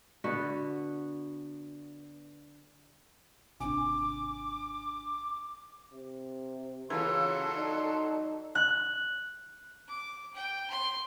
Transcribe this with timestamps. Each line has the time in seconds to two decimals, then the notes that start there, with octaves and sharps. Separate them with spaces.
0.24 D3 B3 F#4
3.60 G#1 C3 D4 G#5 D6
5.93 C3
6.90 C#3 E3 F#3 F4 A4 C6 E6
7.56 D#4 D5
8.55 F#6
9.88 D6
10.34 G5
10.70 C6